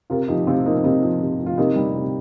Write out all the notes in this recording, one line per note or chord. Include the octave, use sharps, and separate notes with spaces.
C3 F4 A#4
F3 D#4 G4
C3 C4 F4
F3 A#3 D#4
C4
C3 A#3 D#4
F3
C3
F3
F4
C3 A#3 D#4
G3
C3